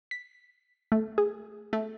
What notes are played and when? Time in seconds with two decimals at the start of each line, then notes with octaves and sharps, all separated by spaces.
0.11 B6
0.92 A3
1.18 G#4
1.73 A3